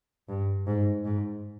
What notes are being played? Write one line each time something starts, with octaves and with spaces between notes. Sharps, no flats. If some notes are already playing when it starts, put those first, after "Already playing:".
G2
G#2
G#2